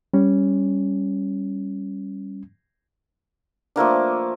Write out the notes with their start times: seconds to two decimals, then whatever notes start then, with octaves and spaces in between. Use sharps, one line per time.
0.14 G3 C#4
3.76 F3 A3 A#3 D4